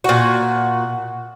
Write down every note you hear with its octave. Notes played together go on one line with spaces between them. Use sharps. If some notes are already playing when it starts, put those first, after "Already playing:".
A#2 F#4